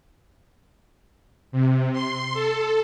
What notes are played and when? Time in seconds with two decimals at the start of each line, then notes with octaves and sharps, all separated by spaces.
1.52 C3
1.93 C6
2.33 A4